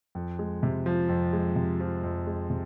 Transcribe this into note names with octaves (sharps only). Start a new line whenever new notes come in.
F2
G#3
C3
F3
F2
G#3
C3
F3
F2
G#3
C3